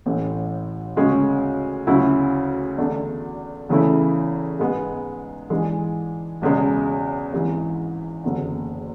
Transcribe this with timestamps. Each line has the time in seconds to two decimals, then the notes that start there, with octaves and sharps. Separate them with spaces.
0.06 A1 A2 E3
0.96 D2 C#3 G#3 C#4
1.87 D2 C#3 F#3 C#4 E4
2.78 E2 D3 A3 D4
3.69 E2 C#3 E3 A3 E4
4.59 G#2 G#3 B3
5.50 G#2 E3 G#3 D4
6.41 E1 E2 C#3 G#3
7.32 G#1 G#2 E3
8.24 F#1 E2 D3